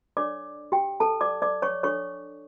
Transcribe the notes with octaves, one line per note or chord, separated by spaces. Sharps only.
D4 A4 C#5 D5 D6
G4 G5
A4 A5
D5 D6
D5 D6
C#5 C#6
D4 A4 C#5 C#6